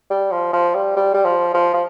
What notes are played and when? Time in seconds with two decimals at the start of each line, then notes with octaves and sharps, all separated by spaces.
0.10 G3
0.32 F3
0.53 F3
0.75 G3
0.96 G3
1.14 G3
1.25 F3
1.54 F3
1.74 F3